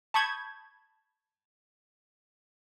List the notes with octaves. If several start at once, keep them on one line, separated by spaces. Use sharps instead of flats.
A5 B5 C#6 D#6 G6 G#6